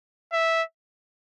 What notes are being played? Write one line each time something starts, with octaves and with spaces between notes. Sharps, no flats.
E5